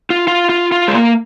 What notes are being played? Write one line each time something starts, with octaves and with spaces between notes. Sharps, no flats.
F4
F4
F4
F4
G#3
A#3